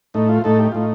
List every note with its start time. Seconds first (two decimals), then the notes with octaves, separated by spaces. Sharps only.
0.14 A2 A3 D#4
0.29 F4
0.44 A2 A3 D#4 A4
0.59 G4
0.72 A2 A3 D#4 F4